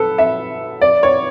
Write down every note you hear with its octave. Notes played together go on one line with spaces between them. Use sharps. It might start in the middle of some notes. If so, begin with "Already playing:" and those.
Already playing: A4 B4
E5
D5
C#5